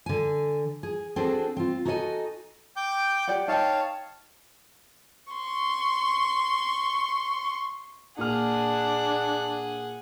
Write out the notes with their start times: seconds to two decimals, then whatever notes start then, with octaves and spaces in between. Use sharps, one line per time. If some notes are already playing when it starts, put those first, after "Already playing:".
0.06 D3 G#5
0.83 G#4
1.16 C4 D4 F#4 G#4 A4 C5
1.57 C4 F4
1.85 D#4 F#4 A4 D5 D#5 G#5
2.76 G5 D6 G6
3.28 G4 D5 F#5
3.48 D#4 C#5 F5 G5 A5
5.33 C6 C#6
8.18 A#2 D4 G#4 F#5 F6